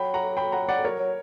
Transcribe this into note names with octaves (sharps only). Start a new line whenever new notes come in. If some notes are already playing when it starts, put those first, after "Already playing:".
Already playing: F#3 G5 B5
F#5 A#5
G5 B5
F#5 A#5
D5 F#5
F#3 A#4 C#5
F#3